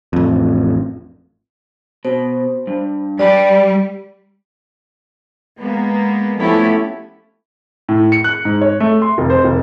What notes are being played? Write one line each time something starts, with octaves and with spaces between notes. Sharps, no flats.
A1 F2
B2 C5
G2
G3 G4 B4 D5
G#3 A#3 B3
F3 A3 B3 C#4 E4 G4
A2
C#7
F#6
G#2
C#5
A3
C6
F1
C5
F1